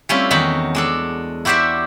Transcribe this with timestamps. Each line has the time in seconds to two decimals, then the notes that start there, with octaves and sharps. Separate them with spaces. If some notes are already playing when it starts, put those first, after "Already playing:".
0.09 G3 A3 C4 C#4 E4 F4
0.31 E2 D#3 D#4 F#4 B5
0.75 G#3 D4 A4
1.45 E4 F#4 G4 C5 D5 E5